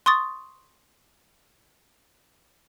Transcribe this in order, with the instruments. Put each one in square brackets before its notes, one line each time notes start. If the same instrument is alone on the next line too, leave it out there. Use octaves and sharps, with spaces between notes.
[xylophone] C6 C#6 D#6 A6